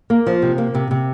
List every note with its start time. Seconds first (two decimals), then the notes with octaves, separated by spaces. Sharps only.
0.10 A#3
0.27 F3
0.42 C3
0.58 A#3
0.75 C3
0.91 C3